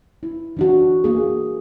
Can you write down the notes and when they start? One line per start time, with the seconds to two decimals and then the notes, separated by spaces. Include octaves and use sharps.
0.23 E4
0.57 E3 D4 F#4
1.04 A#3 G#4